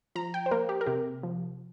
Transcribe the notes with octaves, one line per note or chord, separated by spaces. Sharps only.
F3 A#5
G5
C5
A#3 A#4
G4
A#4
C3 G4
F3